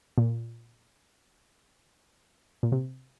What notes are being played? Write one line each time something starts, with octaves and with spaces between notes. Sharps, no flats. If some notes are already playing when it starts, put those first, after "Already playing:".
A#2
A#2
C3